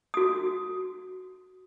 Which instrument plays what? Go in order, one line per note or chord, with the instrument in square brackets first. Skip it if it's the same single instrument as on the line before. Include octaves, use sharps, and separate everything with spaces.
[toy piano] F#4 D#6